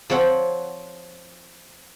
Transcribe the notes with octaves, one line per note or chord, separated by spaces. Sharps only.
F3 C4 C#5 F#5